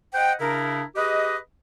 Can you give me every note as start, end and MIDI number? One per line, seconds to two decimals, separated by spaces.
0.14 0.33 72
0.14 0.33 75
0.14 0.33 78
0.14 0.33 79
0.39 0.82 49
0.39 0.82 62
0.39 0.82 64
0.39 0.82 70
0.96 1.36 67
0.96 1.36 68
0.96 1.36 71
0.96 1.36 75